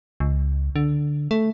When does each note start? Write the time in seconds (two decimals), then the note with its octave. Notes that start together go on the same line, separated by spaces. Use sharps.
0.20 C#2
0.76 D3
1.31 A3